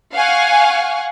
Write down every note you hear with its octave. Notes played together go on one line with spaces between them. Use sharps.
F5 F#5 G#5 C#6